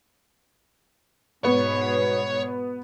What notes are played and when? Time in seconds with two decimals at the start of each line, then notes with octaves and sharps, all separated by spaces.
1.45 G#2 B2 B3 C#5